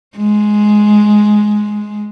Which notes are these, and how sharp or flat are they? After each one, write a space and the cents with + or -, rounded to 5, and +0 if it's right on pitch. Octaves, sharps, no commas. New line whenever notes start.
G#3 +10